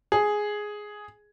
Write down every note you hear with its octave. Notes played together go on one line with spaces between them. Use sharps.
G#4